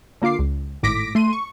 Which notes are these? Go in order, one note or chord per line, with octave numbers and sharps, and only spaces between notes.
D3 A#3 F4 D6 C7
C#2
G#1 A2 D6 A#6 B6 D7
A3 C6 D#7
C#6